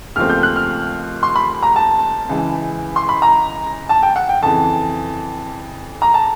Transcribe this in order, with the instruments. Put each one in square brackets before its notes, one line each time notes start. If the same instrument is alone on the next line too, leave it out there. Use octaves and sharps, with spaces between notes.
[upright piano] D#2 C#3 F3 A3 C4 F6
G6
F#6
F6
C6
B5
A#5
A5
C#2 C#3 E3
C6
B5
A#5
A5
G5
F#5
G5
F2 C#3 E3 A5
A#5
A5